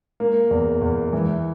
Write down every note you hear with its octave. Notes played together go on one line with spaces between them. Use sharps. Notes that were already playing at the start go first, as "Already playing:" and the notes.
A#3
E2
E2
E3